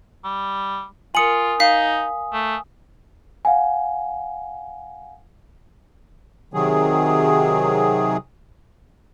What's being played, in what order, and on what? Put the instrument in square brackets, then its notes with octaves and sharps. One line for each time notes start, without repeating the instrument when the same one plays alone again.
[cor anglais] G3
[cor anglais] F4 [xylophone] A#4 C#7 F#7 [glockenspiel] G#5 D#6
[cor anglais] D#4 [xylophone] F5 B6
[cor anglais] A3
[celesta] F5 F#5 G#5
[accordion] C3 D#3 F#3 G#4